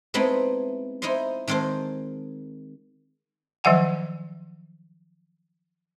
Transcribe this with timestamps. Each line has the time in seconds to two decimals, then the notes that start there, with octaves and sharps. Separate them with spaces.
0.14 G#3 A3 B3 C4 D#4 E4
1.02 D#4 E4 C5 D#5 C6
1.48 D#3 G#3 C4 A4 C5
3.64 D#3 F3 F#3 E5 F#5 G#5